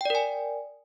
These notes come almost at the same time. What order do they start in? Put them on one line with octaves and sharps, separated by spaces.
G5 D5 A#4 G#5